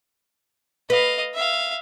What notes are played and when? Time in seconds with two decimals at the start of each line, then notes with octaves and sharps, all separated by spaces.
0.90 B4 D#5 F5
1.34 E5 F5